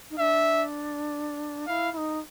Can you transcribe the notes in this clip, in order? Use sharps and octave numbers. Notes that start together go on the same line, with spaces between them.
D#4
D4 E5
E4 F5
E4
D#4